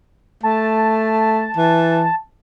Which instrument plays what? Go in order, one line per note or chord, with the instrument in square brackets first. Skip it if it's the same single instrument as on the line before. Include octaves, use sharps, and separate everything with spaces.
[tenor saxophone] A3 [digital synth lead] A5
[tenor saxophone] E3